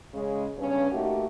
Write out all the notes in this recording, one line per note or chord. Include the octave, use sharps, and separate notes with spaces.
C#3 G#3
G2 C#3 B3 C#4
A3 A#3 D#4 F#4 G4